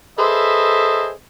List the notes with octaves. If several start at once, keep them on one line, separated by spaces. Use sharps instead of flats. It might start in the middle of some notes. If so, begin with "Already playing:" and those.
G#4 A4 B4 C5 D#5 E5